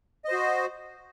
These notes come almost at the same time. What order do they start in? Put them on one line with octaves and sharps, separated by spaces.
D#5 C5 F#4